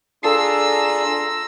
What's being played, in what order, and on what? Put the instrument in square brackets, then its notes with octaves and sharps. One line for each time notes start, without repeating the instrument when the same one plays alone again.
[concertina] D4 F4 G#4 [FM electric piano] A4 A5 C7 [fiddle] A#5 E6